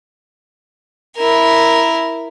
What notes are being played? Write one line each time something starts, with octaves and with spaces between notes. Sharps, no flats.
E4 A#4